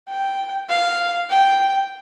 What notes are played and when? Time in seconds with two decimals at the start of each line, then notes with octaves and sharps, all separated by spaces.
0.08 G5
0.69 F5
1.29 G5